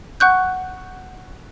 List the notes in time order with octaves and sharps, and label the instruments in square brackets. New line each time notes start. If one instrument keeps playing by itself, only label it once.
[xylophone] F#5 C#6 F#6 G6